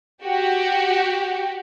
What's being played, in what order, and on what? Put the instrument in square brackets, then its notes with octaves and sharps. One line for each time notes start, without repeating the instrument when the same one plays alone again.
[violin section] F#4 G4